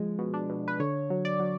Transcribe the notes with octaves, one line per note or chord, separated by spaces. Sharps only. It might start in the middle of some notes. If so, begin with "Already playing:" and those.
Already playing: F3 G#3
B2
D4
B2
B4
D3 C#5
F#3
D5
F#3